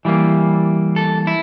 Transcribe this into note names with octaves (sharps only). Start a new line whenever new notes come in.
E3 G3 A#3
A4
E4